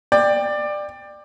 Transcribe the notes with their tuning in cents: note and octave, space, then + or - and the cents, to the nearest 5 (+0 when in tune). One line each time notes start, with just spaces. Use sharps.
D5 +20 G5 +20